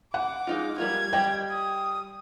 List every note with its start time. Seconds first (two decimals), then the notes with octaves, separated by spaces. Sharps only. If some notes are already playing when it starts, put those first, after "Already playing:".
0.14 F#5 D6
0.47 G#3 D#4 F4
0.78 G3 A#3 F4 G#6
1.13 G3 D#5 G5
1.51 D#6